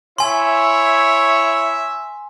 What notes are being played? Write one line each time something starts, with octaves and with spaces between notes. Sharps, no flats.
E4 C#5 E5 G#5 C6